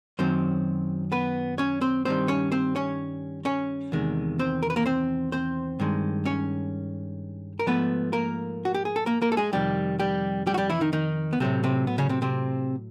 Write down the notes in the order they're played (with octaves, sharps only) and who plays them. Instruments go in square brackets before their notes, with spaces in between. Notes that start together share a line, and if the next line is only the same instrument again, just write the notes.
[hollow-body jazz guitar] F#2 D#3 F#3 C4 C5
B3 B4
C#4 C#5
C4 C5
G2 D#3 G3 C4 C5
C#4 C#5
C4 C5
C#4 C#5
C#4 C#5
E2 C3 D#3 G#3
C4 C5
A#4
B4
A#3 A#4
C4 C5
C4 C5
G2 D#3 G#3
C#4 C#5
A#4
G#2 F3 A3 B3 B4
A#3 A#4
F#4
G4
G#4
A4
A#3 A#4
A#3 A#4
A4
G#3 G#4
F2 C3 D#3 G3 G4
G3 G4
G3 G4
F#4
G3 G4
E3 E4
D#3 D#4
D#3 D#4
B3
A2 C3 F#3 A3 C4
C3 C4
B3
C#3 C#4
C3 C4
C3 C4